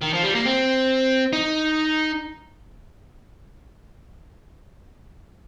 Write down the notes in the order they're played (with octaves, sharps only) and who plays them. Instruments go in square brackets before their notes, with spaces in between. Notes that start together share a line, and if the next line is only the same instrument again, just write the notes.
[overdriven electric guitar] D#3
F3
G3
A#3
C4
D#4